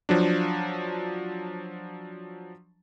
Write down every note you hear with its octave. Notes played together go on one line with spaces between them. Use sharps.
F3 F#3 D4